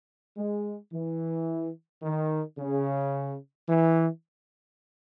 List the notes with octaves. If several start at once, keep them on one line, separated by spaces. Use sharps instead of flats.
G#3
E3
D#3
C#3
E3